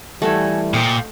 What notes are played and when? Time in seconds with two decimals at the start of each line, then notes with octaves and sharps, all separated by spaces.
0.22 E3 G3 A3 F#4 A4 G#5
0.74 A#2 C5 D#5 G5